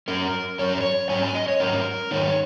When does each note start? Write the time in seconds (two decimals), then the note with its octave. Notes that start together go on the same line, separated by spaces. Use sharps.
0.08 F#2 F#3 C#4 A#4
0.59 F#2 F#3 C#4 C#5
0.70 A#4
0.81 C#5
1.10 G#2 F#3 C#4 G#5
1.23 G#5
1.35 D#5
1.48 C#5
1.60 G#2 F#3 C#4 A#4
2.11 G#2 D#3 G#3 D#4 C#5